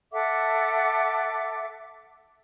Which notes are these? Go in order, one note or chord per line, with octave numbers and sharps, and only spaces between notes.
A4 E5 F#5 D6